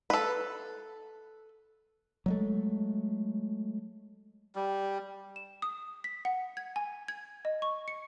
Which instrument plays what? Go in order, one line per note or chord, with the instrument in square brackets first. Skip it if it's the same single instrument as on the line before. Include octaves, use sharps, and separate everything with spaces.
[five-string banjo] A4 B4
[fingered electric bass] F#3 G#3 A3
[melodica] G3
[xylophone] E7
D#6
B6
F#5
G#6
G#5
G#6
D#5
C#6
C#7